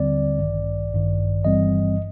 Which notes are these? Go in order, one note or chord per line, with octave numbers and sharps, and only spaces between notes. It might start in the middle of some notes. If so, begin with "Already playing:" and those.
Already playing: D#2 D3 G3 C4 D5
A1 G2 D#3
A1 G2 D#3
G1 G2 E3 G3 C4 D#5